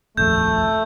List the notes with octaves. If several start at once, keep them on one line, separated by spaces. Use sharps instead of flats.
D#1 A#1 F2 A3 G6